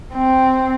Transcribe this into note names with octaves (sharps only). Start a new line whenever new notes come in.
C4